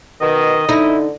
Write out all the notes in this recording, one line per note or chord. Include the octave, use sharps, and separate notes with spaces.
B2 D#3 D#5
D3 D#4 E4